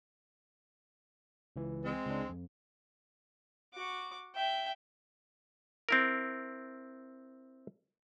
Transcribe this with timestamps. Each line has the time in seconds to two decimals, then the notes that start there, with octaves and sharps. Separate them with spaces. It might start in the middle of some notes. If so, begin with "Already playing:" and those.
1.56 C#2 E3
1.84 G#3 C4
2.06 C#2 D4
2.29 F2
3.74 F#4 D6
4.35 E5 G5
5.89 C4 E4 A#4